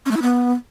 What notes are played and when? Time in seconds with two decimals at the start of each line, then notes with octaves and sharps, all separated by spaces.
0.06 C#4
0.11 A3
0.17 E4
0.22 B3